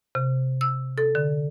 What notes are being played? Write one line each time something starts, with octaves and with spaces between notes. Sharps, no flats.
C3
E6
A4
D3